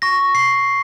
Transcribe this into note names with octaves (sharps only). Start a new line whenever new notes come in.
C#6 A#6
C7